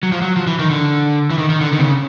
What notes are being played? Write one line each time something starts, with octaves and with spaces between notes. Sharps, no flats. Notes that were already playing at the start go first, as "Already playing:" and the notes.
F#3
F3
F#3
F3
E3
D#3
D3
E3
D#3
D#3
D3
D#3
C3
C#3